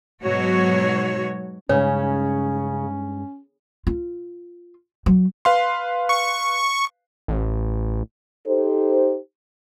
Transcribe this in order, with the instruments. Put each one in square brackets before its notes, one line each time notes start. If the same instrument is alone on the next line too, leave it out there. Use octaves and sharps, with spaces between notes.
[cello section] G#2 B2 F#3 F#4 C#5
[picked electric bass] G2 G#3 [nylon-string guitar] C#3 [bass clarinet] C#4 [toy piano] C#5
[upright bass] F4
F#3
[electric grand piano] B4 F5 C6
[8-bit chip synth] C#6
[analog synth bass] A1
[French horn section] D#4 G4 A4 C5